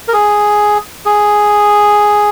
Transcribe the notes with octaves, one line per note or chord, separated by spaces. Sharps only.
A#4
G#4
G#4